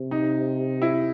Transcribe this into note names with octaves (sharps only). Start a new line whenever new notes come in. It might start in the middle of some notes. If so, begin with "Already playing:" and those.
Already playing: C3
D#4
E4